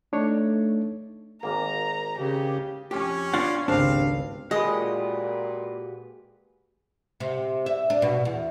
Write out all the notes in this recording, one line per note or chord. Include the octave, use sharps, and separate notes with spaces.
A3 D4 D#4 C#5
G#1 A#3 A#5
C#3 G4
F2 C#4 G4
B3 D4 F4 C5 F5 F#5
G#1 C#2 C4 D4 G4 F5
A#2 G#3 F#4 G4 B4 D#5
C3
E5
D4
B2
E2